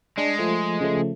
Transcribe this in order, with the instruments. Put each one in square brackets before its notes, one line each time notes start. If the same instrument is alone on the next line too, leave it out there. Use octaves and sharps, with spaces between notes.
[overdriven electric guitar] G#3 [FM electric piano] D4
[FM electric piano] F3 A3
C#3 F3 A3